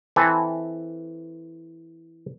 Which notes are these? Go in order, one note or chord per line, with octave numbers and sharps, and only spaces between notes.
E3 C4 A4 G#5